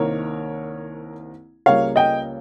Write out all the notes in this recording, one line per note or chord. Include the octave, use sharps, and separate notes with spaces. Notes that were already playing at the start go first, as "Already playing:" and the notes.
Already playing: C2 C3 D#3 A#3 A#4 C#5
C#2 C#3 G3 A#3 C#5 F5
D#5 G5